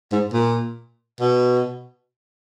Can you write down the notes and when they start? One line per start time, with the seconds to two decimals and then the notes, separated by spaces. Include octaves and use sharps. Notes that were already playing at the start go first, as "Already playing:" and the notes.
0.12 G#2
0.34 A#2
1.21 B2